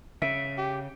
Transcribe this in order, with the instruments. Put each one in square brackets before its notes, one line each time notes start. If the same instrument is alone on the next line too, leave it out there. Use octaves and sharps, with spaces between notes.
[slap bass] C#3 [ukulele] E5
[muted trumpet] G4